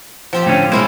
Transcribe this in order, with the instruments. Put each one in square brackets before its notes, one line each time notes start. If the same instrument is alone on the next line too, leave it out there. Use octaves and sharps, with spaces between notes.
[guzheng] F3 C4 G4
[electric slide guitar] A2 D3 C#4
[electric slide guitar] B2 G#3 A#3 [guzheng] C#4 E4 C5